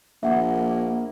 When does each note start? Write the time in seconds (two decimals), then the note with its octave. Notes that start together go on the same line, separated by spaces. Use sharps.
0.23 A#1 A#3 E5 F#5